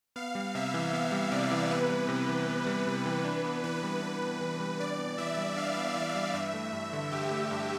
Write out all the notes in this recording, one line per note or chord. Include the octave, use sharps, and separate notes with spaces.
B3 F5
G3
C3 E5
E3
B3 F5
G3
C3 D5
E3
B3 B4
G3
C3
E3
B3
G3
C3
E3
D4 B4
B3
E3 B4
G3
D4 B4
B3
E3
G3
D4 D5
B3
E3 E5
G3
D4 F5
B3
E3 E5
G3
G2 E5
A3
G2
D3
G2 G4
A3
G2